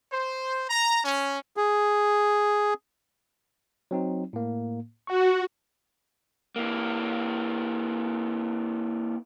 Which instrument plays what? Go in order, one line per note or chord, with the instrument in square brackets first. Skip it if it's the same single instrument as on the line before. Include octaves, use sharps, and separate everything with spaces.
[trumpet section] C5
A#5
C#4
[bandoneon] G#4
[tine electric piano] F#3 C4 D#4
A2 A#3
[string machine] F#4 [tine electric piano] F#5 C#6
[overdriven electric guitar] E3 A#3